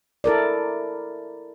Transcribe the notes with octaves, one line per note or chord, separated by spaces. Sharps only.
E4 A4 A#4 D5